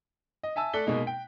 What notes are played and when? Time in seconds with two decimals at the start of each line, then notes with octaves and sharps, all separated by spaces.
0.43 D#5
0.56 E5 G#5 A5 E6
0.73 A3 A4 D5 F#6 B6 G7
0.86 B2 G#3 A#3 D#4
1.07 G5